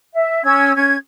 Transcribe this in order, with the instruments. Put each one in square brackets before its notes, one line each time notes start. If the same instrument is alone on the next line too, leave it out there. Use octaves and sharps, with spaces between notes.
[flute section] E5
C#4 E6 G#6
C#4 G#6